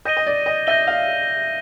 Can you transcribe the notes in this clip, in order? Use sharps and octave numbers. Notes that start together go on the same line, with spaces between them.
D#5 G6 A#6 D#7 G7
D#5
D5
D#5
E5 G6 A#6 D#7 G7
F5